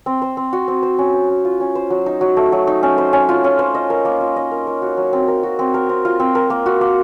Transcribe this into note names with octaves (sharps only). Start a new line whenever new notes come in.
C4
C5
C4
F#4
C4
C5
C#4
C5
C#4
F4
C#4
C5
F#3
D#4
F#3
A3
F#3
D#4
C#4
C5
C#4
F4
C#4
C5
D#5
A#4
A#3
F4
D#5
A#4
A#4
F#4
F#3
C4
A#4
F#4
C4
A#4
C4
F4
C4
A#4
A#3
F#4
A#3